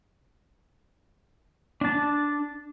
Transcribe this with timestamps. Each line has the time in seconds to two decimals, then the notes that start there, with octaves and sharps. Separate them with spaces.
1.81 D4 A5